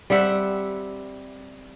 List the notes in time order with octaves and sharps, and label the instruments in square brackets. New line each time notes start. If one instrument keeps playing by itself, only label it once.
[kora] G3 C4 E5 F#5